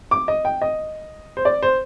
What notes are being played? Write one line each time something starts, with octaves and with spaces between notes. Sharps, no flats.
D6
D#5
G5
D#5
C5
D5
C5